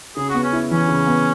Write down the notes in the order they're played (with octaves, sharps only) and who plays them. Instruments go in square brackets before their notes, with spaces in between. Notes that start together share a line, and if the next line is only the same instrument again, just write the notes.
[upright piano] C#3 [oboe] G#4
[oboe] F#4
[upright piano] B3
[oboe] C#4
[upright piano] E4
[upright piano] E3 [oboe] C#4
[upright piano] C#3
B3